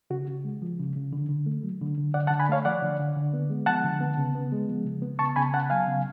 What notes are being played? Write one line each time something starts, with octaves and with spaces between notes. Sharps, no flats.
C#3 F#4
C#3
G#3
F3
C#3
C#3
D3
D3
A3
F#3
D3
D3
D3 D5 F#5
F#5 A5
D3
G#5 B5
A3 C#5 F5
F3 D5 F#5
D3
D3
D3
B3
G#3
F3 F#5 A5
D3
B3
C#3
B3
G#3
F3
C#3
B3
C#3 A5 C#6
C#3 G#5 B5
B3 F#5 A5
F#3 F5 G#5
C#3